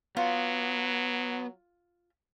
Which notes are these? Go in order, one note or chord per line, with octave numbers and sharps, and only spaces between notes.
F#3 B3 F4